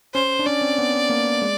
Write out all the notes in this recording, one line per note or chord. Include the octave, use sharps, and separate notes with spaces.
C#4 C5
D4
C#4 D5
C4
B3
A#3
G#3